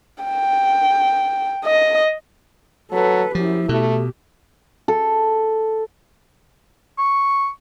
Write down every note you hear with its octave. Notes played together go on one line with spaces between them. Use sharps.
G5
D#5
F#3 A4 B4
F#2 F3 E4 G4
B2 A3 G4
A4
C#6